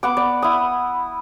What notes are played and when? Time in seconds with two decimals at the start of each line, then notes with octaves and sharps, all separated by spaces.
0.03 B3 F#5 D6
0.17 D5
0.42 E4 D#6